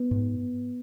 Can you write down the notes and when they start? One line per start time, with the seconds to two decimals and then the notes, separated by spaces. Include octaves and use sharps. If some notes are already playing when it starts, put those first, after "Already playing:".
Already playing: B3
0.11 G#2